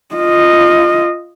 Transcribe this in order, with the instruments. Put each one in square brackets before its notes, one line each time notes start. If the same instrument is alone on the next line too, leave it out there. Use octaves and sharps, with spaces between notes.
[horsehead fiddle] F4 D#5